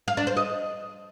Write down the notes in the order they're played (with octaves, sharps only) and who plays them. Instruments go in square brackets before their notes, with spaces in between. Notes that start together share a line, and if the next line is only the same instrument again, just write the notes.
[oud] F5
D4
C5
D#5